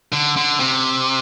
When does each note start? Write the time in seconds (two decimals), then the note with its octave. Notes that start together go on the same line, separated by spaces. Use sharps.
0.12 D3
0.37 D3
0.60 C3